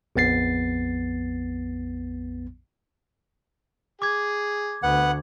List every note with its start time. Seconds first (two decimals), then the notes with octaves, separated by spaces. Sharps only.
0.16 A#1 F2 B3 A6 C7
4.02 G#4 D6 G#6
4.83 D2 B3 F#5